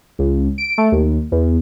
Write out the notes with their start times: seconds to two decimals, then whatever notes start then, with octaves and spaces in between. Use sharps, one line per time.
0.19 C#2
0.58 D7
0.78 A3
0.92 D#2
1.32 E2